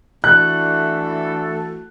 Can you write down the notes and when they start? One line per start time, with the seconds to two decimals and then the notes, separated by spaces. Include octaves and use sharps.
0.23 E3 A3 D4 F#4 A4 F#6